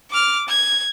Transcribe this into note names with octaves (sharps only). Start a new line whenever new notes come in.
D6 F6
G#6